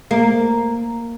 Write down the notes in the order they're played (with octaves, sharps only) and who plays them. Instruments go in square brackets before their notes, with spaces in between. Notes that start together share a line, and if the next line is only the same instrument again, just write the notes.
[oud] A#3